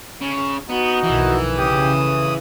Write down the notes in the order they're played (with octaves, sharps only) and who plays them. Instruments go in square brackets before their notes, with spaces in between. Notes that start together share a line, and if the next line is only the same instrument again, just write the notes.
[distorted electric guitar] C#3
[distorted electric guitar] B3 [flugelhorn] D#4 [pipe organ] F#4
[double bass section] B1 F2 D#3 [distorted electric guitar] E3
[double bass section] C#3 [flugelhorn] G4 [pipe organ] D#6
[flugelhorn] A3